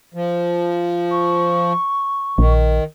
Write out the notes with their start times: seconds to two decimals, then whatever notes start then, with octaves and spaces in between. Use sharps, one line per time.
0.14 F3
1.11 C#6
2.38 A#1 D#3